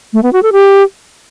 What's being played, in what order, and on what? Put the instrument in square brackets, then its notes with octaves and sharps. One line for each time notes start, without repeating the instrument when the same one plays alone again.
[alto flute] A3
B3
F#4
A4
G4